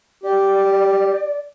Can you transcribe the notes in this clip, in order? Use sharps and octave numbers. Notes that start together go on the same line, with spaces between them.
G4 D5